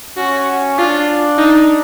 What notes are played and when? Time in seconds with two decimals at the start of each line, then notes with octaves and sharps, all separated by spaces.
0.17 C#4 F#4
0.78 D4 F4
1.38 D#4